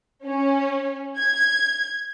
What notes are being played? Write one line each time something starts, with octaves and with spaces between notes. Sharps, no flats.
C#4
G#6